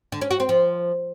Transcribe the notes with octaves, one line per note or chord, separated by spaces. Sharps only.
D3
C#4
F#4
C4
F3